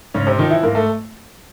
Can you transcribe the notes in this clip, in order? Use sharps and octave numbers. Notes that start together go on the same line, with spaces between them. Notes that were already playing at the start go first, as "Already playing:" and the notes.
G#2 C#3 C#4
C3 C4
D#3 F3 D#4
E3 E4
G#2 A#3 A#4
A3 A4